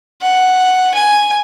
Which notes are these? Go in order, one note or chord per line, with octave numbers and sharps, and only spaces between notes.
F#5
G#5